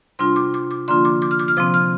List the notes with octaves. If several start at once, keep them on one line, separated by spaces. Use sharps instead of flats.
C3 G3 D4 F4 C6
D6
D6
D6
D3 F3 A#3 D4 F4 C6
D6
D6
F6
D6
F6
C3 F3 C4 D6
F6